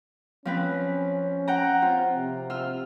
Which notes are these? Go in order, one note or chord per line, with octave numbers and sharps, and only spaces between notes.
F3 C4 C#4 B4
F#5 G5 A#5
C4 F4
C3
F4 E6 F6